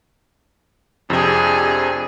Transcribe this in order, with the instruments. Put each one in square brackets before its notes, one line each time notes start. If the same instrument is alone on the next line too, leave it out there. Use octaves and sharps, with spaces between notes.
[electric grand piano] F2 C3 [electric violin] D4 G#4